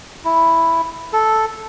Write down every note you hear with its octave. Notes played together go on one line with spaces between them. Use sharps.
E4
A4